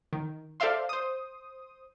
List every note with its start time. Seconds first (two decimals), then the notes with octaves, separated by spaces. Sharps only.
0.13 D#3
0.60 A4 C5 D5 E5 F5 C6
0.89 C5 D#6